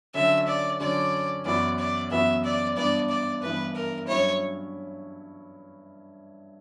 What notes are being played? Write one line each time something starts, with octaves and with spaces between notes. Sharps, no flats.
D3 F#3 C#4 E5
D5
D3 F#3 C#4 D5
F#2 E3 B3 F#4 D5
D5
F#2 E3 B3 F#4 E5
D5
G2 E3 B3 D4 D5
D5
G2 E3 B3 D4 B4
A#4
G2 F#3 C#4 E4 C#5